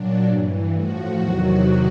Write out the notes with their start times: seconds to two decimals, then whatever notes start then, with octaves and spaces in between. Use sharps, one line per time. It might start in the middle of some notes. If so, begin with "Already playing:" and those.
Already playing: A#2 F#3 D4
0.24 G2 E3
0.70 A2 F3 F#4
1.15 E2 C3 D#3 F#3